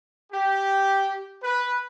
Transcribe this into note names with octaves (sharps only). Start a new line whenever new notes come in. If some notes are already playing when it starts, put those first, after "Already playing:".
G4
B4